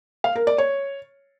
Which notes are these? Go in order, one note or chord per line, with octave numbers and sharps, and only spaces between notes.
F5
A#4
D5
C#5